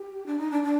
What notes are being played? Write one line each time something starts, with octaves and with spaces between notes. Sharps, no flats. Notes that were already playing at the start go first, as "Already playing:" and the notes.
Already playing: G4
D4
D#4
D4
D4